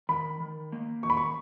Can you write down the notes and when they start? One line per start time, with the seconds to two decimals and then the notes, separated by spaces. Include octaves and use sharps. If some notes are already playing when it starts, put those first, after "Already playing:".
0.09 D#3 B5
0.40 D#3
0.72 A#3
1.03 D#3 C#6
1.10 B5
1.17 C#6